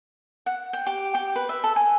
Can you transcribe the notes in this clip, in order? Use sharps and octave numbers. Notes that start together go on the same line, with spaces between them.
F#5
G5
G4
G4
B4
E5
A4
G#5